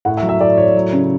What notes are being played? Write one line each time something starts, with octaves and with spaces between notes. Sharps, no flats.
A2 F#5
E5
F#3
E5
A2 D5
A2 C#5
F#3
C#3